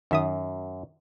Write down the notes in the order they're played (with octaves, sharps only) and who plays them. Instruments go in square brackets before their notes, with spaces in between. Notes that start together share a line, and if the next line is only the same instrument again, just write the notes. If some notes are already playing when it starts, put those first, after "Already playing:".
[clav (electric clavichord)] F#2 [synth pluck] D#3 E5 D#6